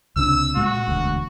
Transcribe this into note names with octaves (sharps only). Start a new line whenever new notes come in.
C#2 C3 D4 E6
A#2 G#3 F#4
E1 D2